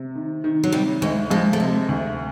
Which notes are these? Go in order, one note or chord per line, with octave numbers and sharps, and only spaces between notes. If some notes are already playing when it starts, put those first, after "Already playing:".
Already playing: C3
D#3
D#3
F#3
C3 G3
D2 G#3
F3 G#3
A3
C3 G#3
D2